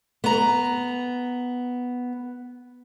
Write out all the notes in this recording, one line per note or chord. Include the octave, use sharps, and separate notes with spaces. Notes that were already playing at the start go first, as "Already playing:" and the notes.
B3 A#5